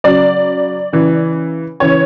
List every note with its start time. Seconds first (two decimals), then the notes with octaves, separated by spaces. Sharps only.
0.04 C#3 F#3 D5
0.93 C#3 E3
1.80 C#3 E3 C#5